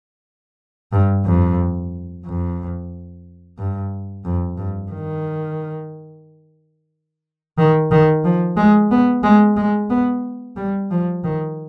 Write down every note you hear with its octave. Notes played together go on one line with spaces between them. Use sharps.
G2
F2
F2
G2
F2
G2
D#3
D#3
D#3
F3
G#3
B3
G#3
G#3
B3
G3
F3
D#3